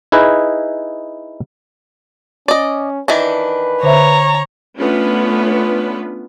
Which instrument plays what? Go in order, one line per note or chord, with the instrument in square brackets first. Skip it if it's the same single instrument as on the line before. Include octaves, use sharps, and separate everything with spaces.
[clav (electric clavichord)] D#4 E4 G#4 B4 D#5
[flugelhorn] C#4 [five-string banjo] D5 D#5
[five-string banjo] D#3 E3 D4 [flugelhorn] B4
[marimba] D3 C5 E5 [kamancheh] C#5 A#5
[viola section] A3 B3 C#4 D4 F4 B4